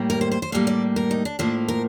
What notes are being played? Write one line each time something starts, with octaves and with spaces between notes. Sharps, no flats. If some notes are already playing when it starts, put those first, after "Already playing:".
Already playing: A2 G3 A#3
A#4
C5
C5
C5
A2 G3 A#3 F5
D5
A#4
D#4
D4
A2 F3 A#3 D4
A#4